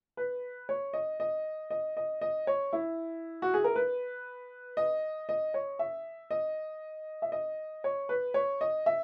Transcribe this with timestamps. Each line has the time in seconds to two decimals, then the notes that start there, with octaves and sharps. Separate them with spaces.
0.17 B4
0.69 C#5
0.93 D#5
1.20 D#5
1.70 D#5
1.97 D#5
2.21 D#5
2.47 C#5
2.73 E4
3.42 F#4
3.54 G#4
3.64 A#4
3.76 B4
4.77 D#5
5.29 D#5
5.54 C#5
5.79 E5
6.31 D#5
7.22 E5
7.32 D#5
7.84 C#5
8.09 B4
8.34 C#5
8.61 D#5
8.86 E5